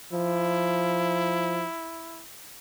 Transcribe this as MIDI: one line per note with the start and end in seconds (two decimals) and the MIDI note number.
0.12 1.66 53
0.12 2.24 64